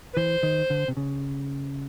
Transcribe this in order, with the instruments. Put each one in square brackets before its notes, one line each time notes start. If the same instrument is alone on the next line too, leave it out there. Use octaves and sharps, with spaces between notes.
[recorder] B4
[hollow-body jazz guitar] E3 [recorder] C5
[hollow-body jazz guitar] D#3
D3
C3
C#3